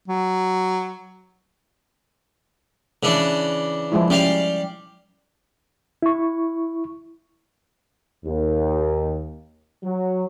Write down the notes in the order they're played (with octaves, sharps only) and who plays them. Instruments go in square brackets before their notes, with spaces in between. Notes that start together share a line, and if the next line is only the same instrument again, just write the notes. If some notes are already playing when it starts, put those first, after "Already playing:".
[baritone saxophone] F#3
[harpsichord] C#3 E3 D4
[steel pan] F3 G#3 E4
[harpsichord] G3 F5 [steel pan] C#4
[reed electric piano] E4 C#6
[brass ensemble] D#2
F#3